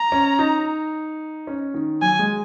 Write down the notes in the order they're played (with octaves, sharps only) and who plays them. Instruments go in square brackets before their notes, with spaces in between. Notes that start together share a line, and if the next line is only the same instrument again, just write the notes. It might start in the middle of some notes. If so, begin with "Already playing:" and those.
Already playing: [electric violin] A#5
[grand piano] C#4
D#4
C#4
D#3
[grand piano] F#3 [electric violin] G#5
[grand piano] G#3